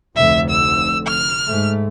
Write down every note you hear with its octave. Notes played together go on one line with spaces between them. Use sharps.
F1 D2 E5
E6
F6
G#2 A3